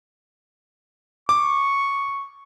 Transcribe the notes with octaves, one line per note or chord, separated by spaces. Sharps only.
C#6 D6